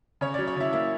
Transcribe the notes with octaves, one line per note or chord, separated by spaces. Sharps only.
C#3 C#5
F#3 D5
C#5
C#3 E4
A#3 E4